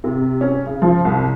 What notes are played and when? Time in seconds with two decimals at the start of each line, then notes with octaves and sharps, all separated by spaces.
0.04 C3
0.41 C#4
0.66 C#3
0.82 F3
1.05 C2